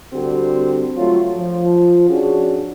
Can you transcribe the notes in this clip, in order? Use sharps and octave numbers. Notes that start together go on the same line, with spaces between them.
D3 G3 C4 F#4 G4
F#3 A3 F4 C#5
F3
C#4 D4 F#4 G#4